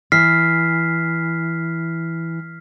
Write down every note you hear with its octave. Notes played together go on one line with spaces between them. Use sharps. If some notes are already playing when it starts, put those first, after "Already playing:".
E3 F6 B6 C7